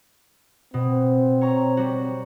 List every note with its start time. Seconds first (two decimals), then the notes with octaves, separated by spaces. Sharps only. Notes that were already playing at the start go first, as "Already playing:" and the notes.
0.74 B2 C4
1.41 C#5 A#5 C#6
1.77 G3 F#4